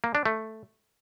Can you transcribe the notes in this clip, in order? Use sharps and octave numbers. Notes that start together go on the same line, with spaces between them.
A#3
D4
A3